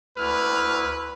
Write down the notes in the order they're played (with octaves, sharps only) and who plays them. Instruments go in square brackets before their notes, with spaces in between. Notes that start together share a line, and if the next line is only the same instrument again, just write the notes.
[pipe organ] D2 E4 [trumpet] B4 [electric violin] F6